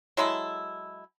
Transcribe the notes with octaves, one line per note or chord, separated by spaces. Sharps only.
F#3 G#3 E4 A4